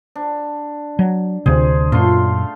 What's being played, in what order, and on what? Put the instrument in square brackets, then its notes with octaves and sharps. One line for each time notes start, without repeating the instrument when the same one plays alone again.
[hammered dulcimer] D4
[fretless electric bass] F#3
[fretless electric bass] D2 C3 [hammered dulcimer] G#4 C5
[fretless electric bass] F#2 A#2 [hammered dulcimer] A3 F4 C6